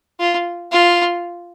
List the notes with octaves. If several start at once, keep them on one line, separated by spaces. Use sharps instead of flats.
F4
F4